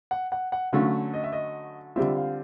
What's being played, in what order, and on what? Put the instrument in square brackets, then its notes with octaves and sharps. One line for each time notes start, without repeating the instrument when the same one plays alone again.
[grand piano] F#5
F#5
F#5
[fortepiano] D3 F#3 A3 C#4 [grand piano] F5
[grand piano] D#5
E5
D#5
[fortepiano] D3 G3 C4 F4 [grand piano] E5
[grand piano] F5